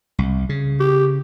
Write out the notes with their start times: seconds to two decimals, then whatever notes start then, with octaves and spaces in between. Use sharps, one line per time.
0.18 C2
0.49 C#3
0.80 G4